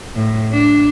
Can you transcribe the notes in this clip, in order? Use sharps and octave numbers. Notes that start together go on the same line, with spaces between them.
A2
D4